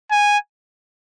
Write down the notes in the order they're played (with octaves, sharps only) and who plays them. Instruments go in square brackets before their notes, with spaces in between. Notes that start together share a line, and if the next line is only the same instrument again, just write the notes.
[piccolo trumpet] G#5